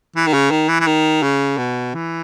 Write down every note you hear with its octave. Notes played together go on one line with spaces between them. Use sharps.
E3
D#3
C#3
D#3
E3
E3
D#3
C#3
B2
E3